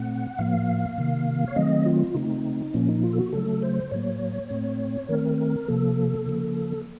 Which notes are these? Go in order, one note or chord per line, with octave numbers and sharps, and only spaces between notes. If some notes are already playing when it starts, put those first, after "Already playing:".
Already playing: A#2 A3 C4 F#5
A2 F3 A#3 F5
C3 D#3 A#3
C#5
D#3 F#3 A3 C4 D#5
F4
C#3 A3 C4 D#4
A#2 F3 A#3 C#4
D#4
F4
A4
F#4
C#3 F#3 A3 A4
C5
A2 F#3 A#3 C#5
A2 A3 C4
D#3 A3 C4 A#4
A#4
C3 F3 A#3 A4
C#3 F3 A#3